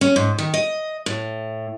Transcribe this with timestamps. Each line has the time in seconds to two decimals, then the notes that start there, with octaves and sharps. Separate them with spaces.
0.01 C#4
0.16 G#2
0.38 D#3
0.54 D#5
1.06 A2